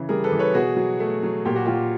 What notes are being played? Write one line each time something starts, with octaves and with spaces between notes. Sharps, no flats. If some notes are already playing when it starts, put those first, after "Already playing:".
Already playing: C#3 E3
G3 G#4 A#4
A4 B4
E3
B4 C#5
B2 F#4 G#4
F#3
A3
F#3
A#2 G4
F#4
F#3 F4 G4